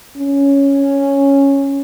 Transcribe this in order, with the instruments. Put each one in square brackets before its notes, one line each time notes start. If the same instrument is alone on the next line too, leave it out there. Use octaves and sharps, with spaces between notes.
[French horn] C#4